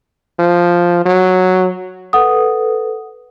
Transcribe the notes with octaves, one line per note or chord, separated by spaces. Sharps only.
F3
F#3
A4 B4 F#5 D#6